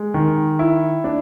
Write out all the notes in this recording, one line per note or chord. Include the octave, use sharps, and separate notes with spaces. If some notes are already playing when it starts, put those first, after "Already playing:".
Already playing: G#3
D#3
E4
D4